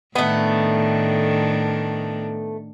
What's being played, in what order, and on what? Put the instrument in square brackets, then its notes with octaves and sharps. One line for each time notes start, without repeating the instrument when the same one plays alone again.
[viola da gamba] A2 D#3 D4 [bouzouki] A3 B3